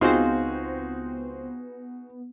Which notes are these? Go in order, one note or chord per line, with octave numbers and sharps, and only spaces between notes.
C#2 B3 C4 D#4 F4 F#4 G#4 C5